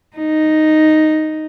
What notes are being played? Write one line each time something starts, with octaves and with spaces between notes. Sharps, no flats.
D#4